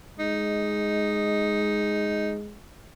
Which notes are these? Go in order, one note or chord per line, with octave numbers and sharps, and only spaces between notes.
G#3 D#4